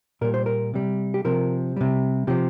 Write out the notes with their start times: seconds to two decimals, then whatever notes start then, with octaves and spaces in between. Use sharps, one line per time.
0.21 A#2 G3 A#4
0.34 C5
0.46 A#4
0.74 C3 G3
1.14 G4
1.25 C3 F3 A#4
1.76 C3 G3
2.27 C3 F3 G4